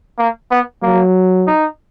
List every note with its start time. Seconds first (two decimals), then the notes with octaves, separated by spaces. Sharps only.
0.18 A#3
0.51 B3
0.82 F#3 A#3
1.47 D#4